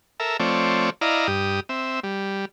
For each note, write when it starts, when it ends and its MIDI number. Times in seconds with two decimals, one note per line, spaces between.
0.20 0.37 69
0.20 0.37 70
0.20 0.37 76
0.40 0.90 53
0.40 0.90 57
0.40 0.90 60
0.40 0.90 73
0.40 0.90 74
1.01 1.27 64
1.01 1.27 74
1.01 1.27 75
1.01 1.27 77
1.01 1.27 82
1.28 1.60 43
1.28 1.60 67
1.28 1.60 87
1.69 2.00 60
1.69 2.00 76
2.04 2.45 55